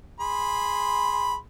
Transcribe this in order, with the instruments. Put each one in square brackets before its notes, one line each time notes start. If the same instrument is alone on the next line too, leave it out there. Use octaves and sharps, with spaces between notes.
[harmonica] G#4 B5 C6